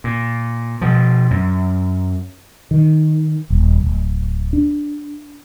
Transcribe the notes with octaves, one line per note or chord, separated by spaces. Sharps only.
A#2
B2 F3
F#2
D#3
D#1
D1
D4